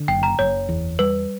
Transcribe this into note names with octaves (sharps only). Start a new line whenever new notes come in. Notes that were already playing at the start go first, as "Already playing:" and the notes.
Already playing: D3
F#1 G5
A#5
F#1 C#5
E2
G3 B4